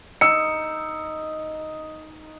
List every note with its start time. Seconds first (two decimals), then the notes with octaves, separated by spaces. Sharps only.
0.21 D#4 E6 C#7